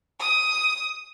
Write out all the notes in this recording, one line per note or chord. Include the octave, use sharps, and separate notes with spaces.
D#6